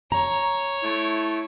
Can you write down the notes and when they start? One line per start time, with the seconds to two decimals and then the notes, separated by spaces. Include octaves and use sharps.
0.12 C#5 A#5
0.83 A3 E4